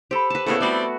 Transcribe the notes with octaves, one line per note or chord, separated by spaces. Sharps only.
G4 A4 C5 B5
B4 A5
A2 C#3 B3 E4 A4
G3 A3 C4 F#4 D5